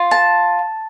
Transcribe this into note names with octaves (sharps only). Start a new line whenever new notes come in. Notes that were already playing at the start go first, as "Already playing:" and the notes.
Already playing: F4
A5